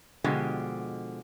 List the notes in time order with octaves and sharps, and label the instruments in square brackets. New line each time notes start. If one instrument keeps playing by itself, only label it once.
[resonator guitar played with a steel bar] B2 D3 F3 G#3 G4